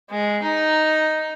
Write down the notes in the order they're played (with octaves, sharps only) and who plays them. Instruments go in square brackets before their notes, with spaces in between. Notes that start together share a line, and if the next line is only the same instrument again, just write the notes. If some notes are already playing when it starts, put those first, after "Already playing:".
[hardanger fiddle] G#3
D#4